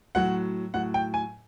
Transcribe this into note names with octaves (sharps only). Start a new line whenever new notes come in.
A2 F#3 F#5
A2 F#3 F#5
G5
G#5